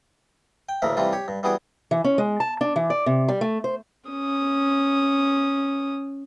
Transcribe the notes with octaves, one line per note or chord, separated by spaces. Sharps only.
G5
A1 D2 C#3 A3 A#4 E5
C3 E3 G3 A3 F4
G4 C#5
G2
E3 G3 B3 F#4 G#4 D6
E3
C#4
G#3
A5
D4
E3
D5
C3
G3
A3
C5
C#4 D#6